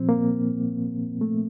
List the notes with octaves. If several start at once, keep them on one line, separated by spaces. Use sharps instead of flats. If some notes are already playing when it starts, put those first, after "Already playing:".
Already playing: A#2 F3 C4
A#3
A3